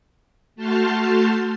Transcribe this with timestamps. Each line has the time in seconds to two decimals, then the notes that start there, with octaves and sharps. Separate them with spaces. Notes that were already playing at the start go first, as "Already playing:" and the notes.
0.56 A3 F#4 A5 C6 F6 G6